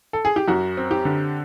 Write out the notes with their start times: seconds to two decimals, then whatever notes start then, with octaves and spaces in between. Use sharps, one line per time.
0.13 A4
0.25 G#4
0.36 G4
0.48 F#2 F#4
0.77 C4
0.91 G4
1.05 D3